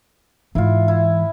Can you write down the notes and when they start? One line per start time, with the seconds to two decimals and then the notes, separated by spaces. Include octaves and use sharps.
0.55 G#2 E3 E4 F4
0.88 E4